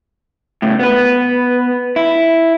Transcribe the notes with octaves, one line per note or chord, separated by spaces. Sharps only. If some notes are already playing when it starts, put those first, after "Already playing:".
A2 C#3
B3 B4
E4